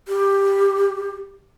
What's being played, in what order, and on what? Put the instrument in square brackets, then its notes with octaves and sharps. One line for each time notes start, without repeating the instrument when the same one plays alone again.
[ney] G4